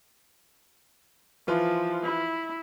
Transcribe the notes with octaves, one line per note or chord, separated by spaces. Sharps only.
E3 F3 F4 B4
E4